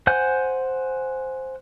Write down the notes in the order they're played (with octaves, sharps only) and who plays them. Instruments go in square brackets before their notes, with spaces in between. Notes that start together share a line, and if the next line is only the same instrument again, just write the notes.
[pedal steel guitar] C5 F#5 G#5 G6